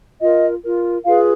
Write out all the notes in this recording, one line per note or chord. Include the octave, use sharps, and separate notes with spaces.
F4 A#4 D#5
F4 A#4
F4 G#4 B4 F5